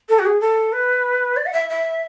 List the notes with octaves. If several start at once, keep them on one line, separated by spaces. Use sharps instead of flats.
A4
F#4
G#4
A4
B4
D5
F#5
E5
E5